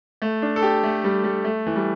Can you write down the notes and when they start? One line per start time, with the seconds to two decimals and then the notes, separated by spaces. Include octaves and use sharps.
0.22 A3
0.42 D4
0.56 A4
0.62 G4
0.83 A3
1.04 G3
1.24 G3
1.44 A3
1.67 E3
1.76 G3